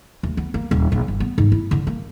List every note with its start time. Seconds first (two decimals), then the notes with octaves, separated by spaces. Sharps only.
0.23 D2
0.37 B3
0.54 A#3
0.71 D#1
0.92 A#1
1.08 G1
1.20 B3
1.38 G#2
1.52 E4
1.71 D3
1.87 A#3